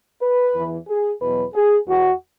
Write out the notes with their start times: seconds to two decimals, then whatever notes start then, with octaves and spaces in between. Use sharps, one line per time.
0.22 B4
0.55 E2 E3
0.88 G#4
1.21 E2 B2 F#3 B4
1.54 G#4
1.88 E2 E3 F#4